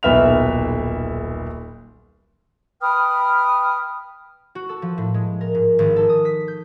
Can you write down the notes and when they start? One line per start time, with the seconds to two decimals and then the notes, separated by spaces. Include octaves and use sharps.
0.03 D#1 B1 B4 E5 F6 F7
2.80 B4 G5 D#6 F6
4.55 F#4
4.69 A4
4.82 F3
4.98 A2
5.14 G#3
5.41 A#4
5.55 G#2
5.79 G#1
5.96 A4
6.09 D#6
6.25 B6
6.48 G6